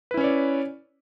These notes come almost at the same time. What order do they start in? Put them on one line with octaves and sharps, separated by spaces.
B4 E4 C#4 C#5 D5